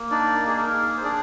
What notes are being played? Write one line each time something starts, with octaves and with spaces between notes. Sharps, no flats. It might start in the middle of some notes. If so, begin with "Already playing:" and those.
Already playing: A#3
D4 D#4 D5
A#3
G#4
A#4
G#4
C5
D4 G#4 D5